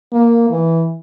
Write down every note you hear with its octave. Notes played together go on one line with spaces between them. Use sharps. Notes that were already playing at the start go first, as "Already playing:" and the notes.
A#3
E3